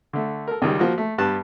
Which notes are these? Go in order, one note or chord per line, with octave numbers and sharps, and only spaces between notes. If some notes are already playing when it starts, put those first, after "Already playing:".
D3 A3
A4 A#4
C#2 D#3 G3
F3 A#3 F#4
A3
G2 B3 G4 A5 F#6